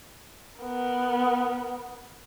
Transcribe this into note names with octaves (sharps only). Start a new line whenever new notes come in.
B3 A#4